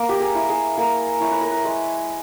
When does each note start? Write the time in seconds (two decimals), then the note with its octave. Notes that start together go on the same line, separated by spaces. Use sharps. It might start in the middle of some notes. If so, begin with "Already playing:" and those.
Already playing: A#3 A#4
0.09 G4
0.20 G#4
0.35 E4
0.49 G#4
0.78 A#3 A#4
1.21 E4 C#5
1.31 B4
1.41 A#4
1.51 B4
1.65 G#3